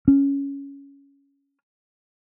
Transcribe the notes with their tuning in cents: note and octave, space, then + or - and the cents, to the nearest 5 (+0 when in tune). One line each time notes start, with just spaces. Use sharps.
C#4 +5